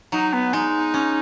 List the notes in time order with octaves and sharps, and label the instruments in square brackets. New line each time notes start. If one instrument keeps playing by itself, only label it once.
[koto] F#3 [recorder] D#4
[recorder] B3
[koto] G#3 [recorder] D#4
[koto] C#4